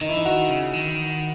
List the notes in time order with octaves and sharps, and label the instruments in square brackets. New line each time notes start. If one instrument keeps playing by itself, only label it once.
[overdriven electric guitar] D#3 [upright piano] D#4
[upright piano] E4
[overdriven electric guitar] E3 [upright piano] D#4
[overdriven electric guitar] D#3 [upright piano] F#4
[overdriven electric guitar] C#3
D#3